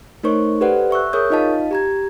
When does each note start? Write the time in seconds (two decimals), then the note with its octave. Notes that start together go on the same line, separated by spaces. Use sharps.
0.23 A3 D#4 A#4 C5 C#5 C#6
0.61 G4 A4 B4 C5 D5 F#5
0.91 E5 C#6 E6 F#6
1.13 G#4 A#4 C#5 C#6 D#6 G6
1.30 D#4 F4 D#5 F5 A5
1.71 G4 A#5 G#6